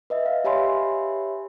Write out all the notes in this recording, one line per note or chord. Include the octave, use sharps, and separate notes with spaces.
B4 D#5 E5
F5
G4 C#5 E5 G#5 B5 C6